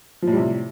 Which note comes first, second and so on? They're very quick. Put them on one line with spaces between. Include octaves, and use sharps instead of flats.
F3 A2 G3 C3